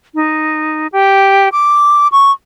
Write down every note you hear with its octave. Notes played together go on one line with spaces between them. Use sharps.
D#4
G4
D6
C#6